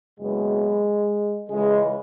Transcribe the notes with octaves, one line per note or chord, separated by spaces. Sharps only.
F#1 E2 B2 F#3 G#3
C#2 C#3 E3 G#3